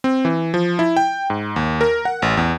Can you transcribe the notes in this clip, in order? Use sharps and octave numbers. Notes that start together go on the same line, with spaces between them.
C4
E3
F3
E4
G5
G#2
D#2
A#4
F#5
A1
E2